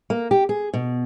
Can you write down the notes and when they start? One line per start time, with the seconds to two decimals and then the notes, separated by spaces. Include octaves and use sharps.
0.10 A#3
0.31 G4
0.49 G#4
0.74 B2